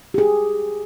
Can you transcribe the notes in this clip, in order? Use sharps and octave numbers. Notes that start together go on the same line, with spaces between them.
G4 G#4